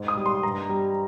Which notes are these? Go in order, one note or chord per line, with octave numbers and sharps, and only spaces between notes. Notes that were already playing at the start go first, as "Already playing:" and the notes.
Already playing: G#2
D#6
G3
C6
G2 A#5
G3